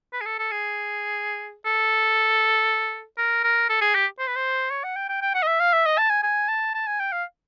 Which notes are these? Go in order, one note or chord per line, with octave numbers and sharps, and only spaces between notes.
B4
G#4
A4
A4
G#4
A4
A#4
A#4
A4
G#4
G4
C5
B4
C5
C#5
F#5
G5
G5
G5
F#5
D#5
E5
F5
E5
D#5
A5
G#5
G#5
A5
A5
G#5
G5
F5